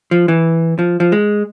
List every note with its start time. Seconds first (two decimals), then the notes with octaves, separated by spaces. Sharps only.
0.11 F3
0.28 E3
0.79 F3
1.00 F3
1.12 G#3